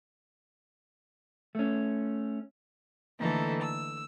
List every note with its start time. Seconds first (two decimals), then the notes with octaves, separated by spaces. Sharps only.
1.55 A3 C#4
3.20 D3 E3 A3 A#3 D#4 A4
3.61 E6